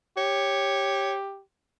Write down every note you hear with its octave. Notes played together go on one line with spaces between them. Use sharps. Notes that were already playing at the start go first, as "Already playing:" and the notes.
G4 C#5